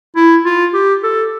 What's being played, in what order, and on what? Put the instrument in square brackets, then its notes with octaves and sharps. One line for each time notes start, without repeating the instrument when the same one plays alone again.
[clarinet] E4
F4
G4
A4